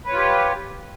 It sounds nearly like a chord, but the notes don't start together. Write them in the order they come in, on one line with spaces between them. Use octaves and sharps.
B4 C#5 F4 G4